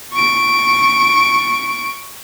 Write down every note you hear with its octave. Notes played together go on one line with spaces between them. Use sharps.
C#6 D7